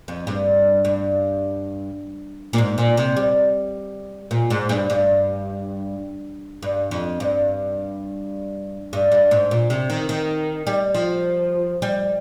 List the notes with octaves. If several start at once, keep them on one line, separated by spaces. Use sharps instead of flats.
F2
G2
G2
A#2
G#2
A#2
C3
G3
A#2
G#2
G2
G2
G2
F2
G2
G2
G2
G#2
A#2
C3
D#3
D#3
G3
F3
G3